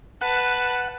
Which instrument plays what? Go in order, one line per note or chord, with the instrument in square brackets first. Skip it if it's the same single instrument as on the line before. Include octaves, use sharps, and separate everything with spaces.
[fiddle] B4 A5 [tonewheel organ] F#5